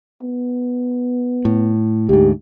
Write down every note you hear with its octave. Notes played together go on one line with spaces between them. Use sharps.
B3
A2
D2 G#2 G4